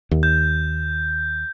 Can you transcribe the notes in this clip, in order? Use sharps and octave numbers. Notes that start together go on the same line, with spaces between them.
D#2
G6